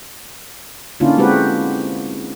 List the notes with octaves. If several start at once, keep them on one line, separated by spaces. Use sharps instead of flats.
D3 A#3 C#4 D4 E4 F4
G#3 C4 F#4 G4 B4